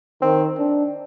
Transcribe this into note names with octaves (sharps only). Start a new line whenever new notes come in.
D#3 C4
D4